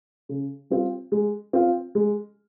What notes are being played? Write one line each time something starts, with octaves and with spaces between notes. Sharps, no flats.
C#3
G3 C4 F4
G#3
C4 F4
G#3